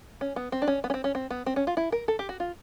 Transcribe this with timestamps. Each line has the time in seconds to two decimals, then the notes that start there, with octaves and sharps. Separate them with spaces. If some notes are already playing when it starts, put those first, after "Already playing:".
0.21 C#4
0.36 B3
0.52 C4
0.62 D4
0.68 C#4
0.84 B3
0.90 C#4
0.94 C4
1.04 C#4
1.15 C4
1.30 B3
1.46 C4
1.56 C#4
1.67 F4
1.77 E4
1.92 A#4
2.08 A4
2.19 G4
2.29 F#4
2.40 F4